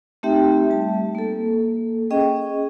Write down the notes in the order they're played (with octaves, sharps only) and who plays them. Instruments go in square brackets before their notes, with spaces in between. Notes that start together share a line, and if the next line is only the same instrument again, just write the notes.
[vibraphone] A3 C4 D#4 G4 E5 G5
G3 A5
A#3 A4
C#4 G#4 D#5 G5